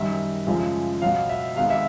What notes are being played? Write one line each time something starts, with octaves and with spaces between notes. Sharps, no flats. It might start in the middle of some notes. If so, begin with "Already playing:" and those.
Already playing: F#2 D#3 G3 E5
F#2 C#3 F3 G#3
B2 F#3 B3 F5
E5
C3 D#3 G#3 B3 F5
E5